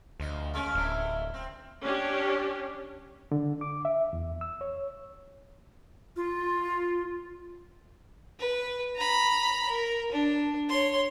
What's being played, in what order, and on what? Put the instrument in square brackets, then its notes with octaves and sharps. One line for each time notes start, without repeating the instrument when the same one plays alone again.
[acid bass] D2 [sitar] F3 D#5
[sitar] G#3 A#3 C#4
[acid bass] D1 [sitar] F3 A3 E4
[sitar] C4
[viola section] C#4 D4 G4
[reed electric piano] D3
D6
E5
E2
E6
C#5
[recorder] F4
[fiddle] B4
A#5 B5
A#4
D4
C#5 C6